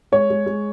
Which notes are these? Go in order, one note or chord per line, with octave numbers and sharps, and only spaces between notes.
G#3 C#5
G#3
G#3